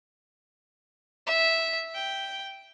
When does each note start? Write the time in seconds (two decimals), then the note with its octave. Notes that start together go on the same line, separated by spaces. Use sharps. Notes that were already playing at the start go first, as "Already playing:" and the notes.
1.27 E5
1.95 G5